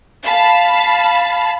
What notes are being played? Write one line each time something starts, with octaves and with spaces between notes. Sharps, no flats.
F5 A5 B5